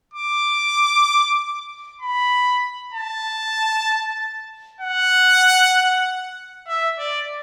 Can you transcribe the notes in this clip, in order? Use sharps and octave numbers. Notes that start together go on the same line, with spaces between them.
D6
B5
A5
F#5
E5
D5